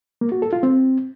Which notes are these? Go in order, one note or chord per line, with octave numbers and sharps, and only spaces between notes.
A#3
F#4
A4
F4
C4